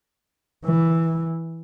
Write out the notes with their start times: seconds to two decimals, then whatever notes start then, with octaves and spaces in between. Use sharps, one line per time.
0.65 E3